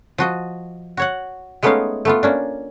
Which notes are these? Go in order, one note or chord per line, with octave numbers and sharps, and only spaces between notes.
F3 F#4 D#5
F#4 C#5 F#5
G#3 A3 B3 C#4 D#4 F5
A3 B3 F4
A#3 C#4 D4